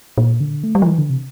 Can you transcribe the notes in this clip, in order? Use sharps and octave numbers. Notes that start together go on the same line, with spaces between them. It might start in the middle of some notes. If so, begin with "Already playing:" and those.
A#2
D3
A3
G3
F3
E3
D3
C3